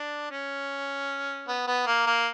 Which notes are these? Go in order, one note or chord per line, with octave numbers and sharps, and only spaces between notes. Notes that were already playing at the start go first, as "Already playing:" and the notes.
Already playing: D4
C#4
B3
B3
A#3
A#3